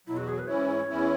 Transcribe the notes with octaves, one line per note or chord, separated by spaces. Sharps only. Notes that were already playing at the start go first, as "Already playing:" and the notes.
E2 B2 F#3 E4
F#4
G#4
B4
G#2 E3 C#4 E4 C#5
E2 E3 C#4 E4